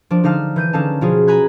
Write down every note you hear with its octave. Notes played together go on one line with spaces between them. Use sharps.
F3 D4
D3 D#4 F5 A5 F6 A6
E3 G6 D#7
D3 C#4 D#4 A4 F5 A5
B2 F3 C#4 F4 F#4 G#4
G#5 A#5 B5 F#6 G#6